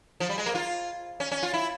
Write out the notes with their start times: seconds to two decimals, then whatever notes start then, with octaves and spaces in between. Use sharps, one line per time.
0.20 F3
0.29 G3
0.38 G#3
0.46 A#3
0.55 F4
1.20 C#4
1.32 C#4
1.43 F4
1.53 E4